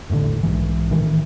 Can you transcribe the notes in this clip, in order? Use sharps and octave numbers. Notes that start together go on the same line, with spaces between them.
E1 A1 A2 D3
B1 G#2 E3
A1 D#3 E3